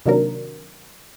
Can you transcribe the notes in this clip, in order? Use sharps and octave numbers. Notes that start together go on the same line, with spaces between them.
C3 D#3 F#3 A#3 D4 A#4